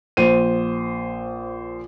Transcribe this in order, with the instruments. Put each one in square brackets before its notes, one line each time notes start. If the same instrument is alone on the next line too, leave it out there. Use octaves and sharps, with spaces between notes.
[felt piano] A#1 C5 D#7